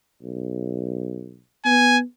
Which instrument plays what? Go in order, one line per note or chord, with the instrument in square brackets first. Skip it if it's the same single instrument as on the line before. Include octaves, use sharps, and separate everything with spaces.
[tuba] B1
[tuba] B3 [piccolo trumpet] G#5